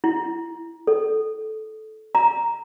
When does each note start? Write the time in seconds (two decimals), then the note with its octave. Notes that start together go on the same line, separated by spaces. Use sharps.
0.04 E4
0.87 A4
2.15 A#5